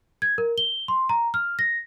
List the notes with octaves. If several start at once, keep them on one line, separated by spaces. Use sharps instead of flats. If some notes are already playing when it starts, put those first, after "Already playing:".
G#6
A#4
G7
C6
A#5
F6
A#6